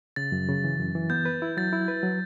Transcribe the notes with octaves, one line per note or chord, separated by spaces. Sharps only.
C#3 A6
F#2
C#3
E3
F#2
E3
B3 G6
B4
E4
F#3 A6
E4
B4
F#3